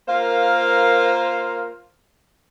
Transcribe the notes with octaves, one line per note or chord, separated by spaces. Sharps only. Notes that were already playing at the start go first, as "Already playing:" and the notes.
A#3 F4 A#4 C5 F5